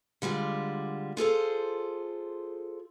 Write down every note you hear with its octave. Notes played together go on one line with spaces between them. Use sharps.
D3 G3 G#3 F4
F4 G#4 A4 C5